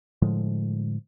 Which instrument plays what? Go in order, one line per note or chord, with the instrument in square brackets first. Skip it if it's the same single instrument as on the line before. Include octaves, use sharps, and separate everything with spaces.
[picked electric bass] A2 D3 F3 G#3